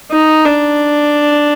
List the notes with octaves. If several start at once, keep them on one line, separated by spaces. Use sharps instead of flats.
D#4
D4